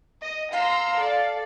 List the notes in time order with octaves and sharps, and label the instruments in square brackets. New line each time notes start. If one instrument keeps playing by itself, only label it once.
[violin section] D#5
[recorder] F5 [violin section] A#5 C6 E6
[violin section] A4 D5